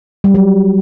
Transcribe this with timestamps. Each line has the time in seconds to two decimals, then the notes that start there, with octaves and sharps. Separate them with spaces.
0.24 G3
0.34 F#3